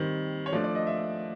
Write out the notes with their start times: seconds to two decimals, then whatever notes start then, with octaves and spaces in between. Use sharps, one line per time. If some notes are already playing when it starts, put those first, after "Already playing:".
Already playing: D#3 G3 C4
0.46 C#5
0.53 F3 A3 D4 D5
0.64 D5
0.75 D#5
0.87 E5